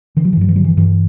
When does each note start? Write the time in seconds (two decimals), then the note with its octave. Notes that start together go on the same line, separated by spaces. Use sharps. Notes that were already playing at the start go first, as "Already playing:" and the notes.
0.17 D3 E3
0.25 F#3
0.33 E3
0.37 G2 F#3
0.49 E3
0.56 D3 F#3
0.64 E3
0.77 G2 E3